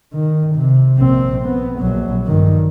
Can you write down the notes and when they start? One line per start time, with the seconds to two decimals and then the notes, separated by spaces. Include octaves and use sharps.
0.13 D#3
0.55 C3
0.97 A#1 C4
1.46 B3
1.79 A#1 F#3
2.26 G2 D#3